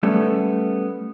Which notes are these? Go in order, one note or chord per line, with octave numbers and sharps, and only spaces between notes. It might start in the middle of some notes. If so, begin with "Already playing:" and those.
G3 A3 B3 C#4 A4